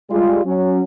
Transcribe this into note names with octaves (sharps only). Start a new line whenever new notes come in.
G3 G#3 F4
F#3 C#4